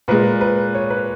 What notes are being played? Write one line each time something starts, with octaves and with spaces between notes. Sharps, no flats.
A#2 G#3 B4
B4
C#5
B4